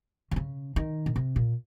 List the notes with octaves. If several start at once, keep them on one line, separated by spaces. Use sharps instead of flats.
D#3
C#3
D#3
A#2
C3
A#2